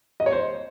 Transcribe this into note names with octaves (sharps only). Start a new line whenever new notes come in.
D#5
C#5
C5